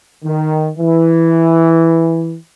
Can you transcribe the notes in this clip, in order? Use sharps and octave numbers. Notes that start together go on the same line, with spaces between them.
D#3
E3